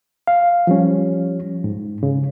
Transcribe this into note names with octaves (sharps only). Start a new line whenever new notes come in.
F5
F3 G3 C#4
G#2
C#3